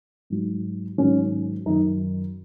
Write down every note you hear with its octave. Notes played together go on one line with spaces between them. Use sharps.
G#2 F#3
G#2 D#3 F#3 C#4
F#2 D#3 F#3 D#4